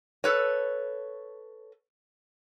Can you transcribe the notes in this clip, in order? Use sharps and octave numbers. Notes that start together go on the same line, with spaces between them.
A4 B4 C#5